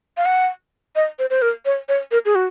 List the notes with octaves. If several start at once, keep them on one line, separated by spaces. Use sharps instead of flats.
F5
F#5
D#5
C5
C5
A#4
C#5
C#5
A#4
G#4
F#4